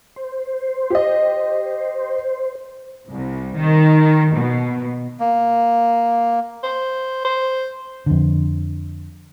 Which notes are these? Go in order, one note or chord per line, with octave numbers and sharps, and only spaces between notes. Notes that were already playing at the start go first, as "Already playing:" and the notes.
C5
G4 D#5
C2
D#3
B2
A#3
C5
C5
F2 D3